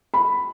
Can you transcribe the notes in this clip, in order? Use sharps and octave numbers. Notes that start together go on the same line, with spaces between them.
B5